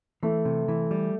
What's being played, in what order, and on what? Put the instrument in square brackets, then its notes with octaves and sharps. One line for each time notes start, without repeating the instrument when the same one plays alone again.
[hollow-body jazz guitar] E3 [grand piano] A3
[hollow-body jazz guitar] C3
E3
G3